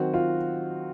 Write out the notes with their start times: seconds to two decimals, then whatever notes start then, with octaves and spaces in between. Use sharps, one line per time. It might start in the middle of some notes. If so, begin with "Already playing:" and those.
Already playing: D#3 F#3 C4 F#4
0.14 F4